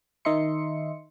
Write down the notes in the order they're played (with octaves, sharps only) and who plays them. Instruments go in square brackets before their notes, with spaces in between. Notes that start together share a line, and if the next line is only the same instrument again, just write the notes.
[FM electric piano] D#3 D#4 D#5 E5 C6 C#7